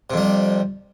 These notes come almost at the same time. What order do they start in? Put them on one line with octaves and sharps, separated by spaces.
C3 F2 G3